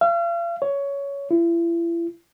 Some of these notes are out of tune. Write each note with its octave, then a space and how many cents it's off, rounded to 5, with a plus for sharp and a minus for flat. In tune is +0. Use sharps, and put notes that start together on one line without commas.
F5 -40
C#5 +15
E4 +35